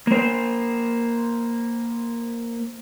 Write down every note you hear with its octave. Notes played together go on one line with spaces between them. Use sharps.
A#3 C5